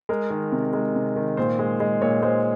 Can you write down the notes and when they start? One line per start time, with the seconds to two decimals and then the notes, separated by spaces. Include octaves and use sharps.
0.09 G#3 A#4
0.30 D#3
0.52 C3
0.73 G#3 A#4
0.95 C3
1.16 D#3
1.37 A#2 C5
1.59 G#3
1.80 G#3
2.01 A#2 C#5
2.23 G#3 C5